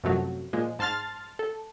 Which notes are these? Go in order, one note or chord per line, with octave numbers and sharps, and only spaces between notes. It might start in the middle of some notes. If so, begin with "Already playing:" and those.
F#2 C3 F3 F#3 A3
A#2 F3 G#3
G#2 A5 C6 F6 A6
A4